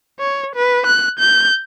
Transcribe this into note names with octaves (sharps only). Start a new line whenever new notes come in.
C#5
B4
F#6
G6